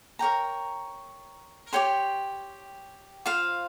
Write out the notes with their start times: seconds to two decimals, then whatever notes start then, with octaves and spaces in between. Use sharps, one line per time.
0.19 A#4 C#5 G5 A#5
1.73 G4 C#5 G5 C6
3.26 F4 C5 F5